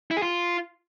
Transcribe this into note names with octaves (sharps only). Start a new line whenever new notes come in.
E4
G#4
F4